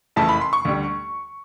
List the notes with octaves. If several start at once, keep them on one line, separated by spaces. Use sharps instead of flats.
F#1 F2 C#3 E3 A3 A5
B5
C6
C#6
D2 D3 G3